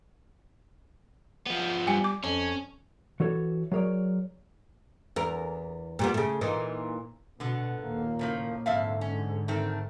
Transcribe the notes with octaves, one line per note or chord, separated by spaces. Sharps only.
F3 B3
G3 G5 G#5
D6
F2 C#4
E3 F#4 A4 C#5
F#3 G#4 A#4 C#5 D5
E2 A#4
A#2 G3 B3
C#3 A3
A#2 E3 D#4
B2 D3 B3
D#2 A#2 A#3
A2 C#3 F3
F2 G#2 D3 E5 F5
C#4
D#3 A3 C4